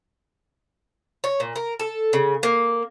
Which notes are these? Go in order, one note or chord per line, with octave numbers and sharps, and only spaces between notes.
C#5
A#2
A#4
A4
C#3
A#3